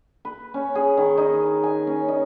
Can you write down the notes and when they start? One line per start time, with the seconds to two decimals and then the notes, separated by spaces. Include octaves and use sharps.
0.25 B4
0.54 C#4
0.75 G#4
0.97 D#3
1.18 D#4
1.63 G#5
1.87 C#4
2.08 D#4